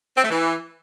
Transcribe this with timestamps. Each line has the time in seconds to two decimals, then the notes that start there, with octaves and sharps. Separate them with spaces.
0.17 C4
0.24 A3
0.30 E3